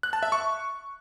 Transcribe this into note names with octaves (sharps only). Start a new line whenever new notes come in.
F#6
A5
E5
C#6